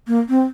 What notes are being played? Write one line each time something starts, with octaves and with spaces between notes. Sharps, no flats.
A#3
C4